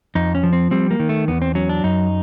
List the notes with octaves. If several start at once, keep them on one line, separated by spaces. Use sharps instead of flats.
F2 D#4
C#4
F3
C4
G3 C4
A#3
D#3
A3
E2 B3
C4
F#3 C#4
D4
F#2 D#4